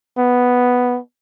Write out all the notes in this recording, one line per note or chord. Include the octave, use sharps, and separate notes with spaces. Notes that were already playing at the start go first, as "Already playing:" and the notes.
B3